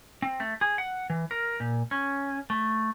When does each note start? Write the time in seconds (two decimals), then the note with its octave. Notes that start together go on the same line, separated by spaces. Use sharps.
0.22 C4
0.40 A3
0.61 G#4
0.78 F#5
1.10 E3
1.31 A#4
1.60 A#2
1.91 C#4
2.50 A3